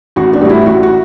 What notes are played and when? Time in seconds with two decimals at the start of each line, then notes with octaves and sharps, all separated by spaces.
0.16 A1 F#4
0.33 D4
0.41 A2 G3 F#4
0.49 E4
0.66 A1 F#4
0.83 F#4